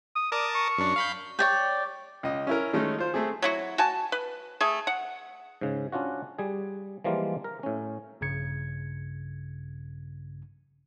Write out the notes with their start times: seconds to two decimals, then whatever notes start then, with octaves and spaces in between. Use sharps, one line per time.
0.16 D#6
0.32 A#4 D5 A5 D#6
0.55 C#6
0.78 F#2 D4
0.96 F5 B5 G6
1.39 C#5 D5 G5
2.23 C#2 D#5
2.47 C#4 E4 A#4
2.73 D#3 G#3 A3 C#4 D#4
2.99 F4 C5
3.14 A3 C4 G#4
3.42 F#3 E4 F#4
3.78 F#4 G#5 A5
4.12 B4
4.60 A3 G#4
4.87 F#5
5.61 G#2 C#3
5.92 C#4 D4 F4 F#4
6.39 G3 G#4
7.04 E3 F3 G3 G#3 A#3 F4
7.44 A#4
7.63 A2 C#4
8.21 A#1 G2 C#3 G#6 C#7